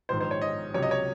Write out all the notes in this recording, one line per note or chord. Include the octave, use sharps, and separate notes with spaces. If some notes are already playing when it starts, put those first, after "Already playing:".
A#1 G#2 D#3 C5
C5
C#5
D#5
C#2 C3 F#3 C#5
D#5
C#5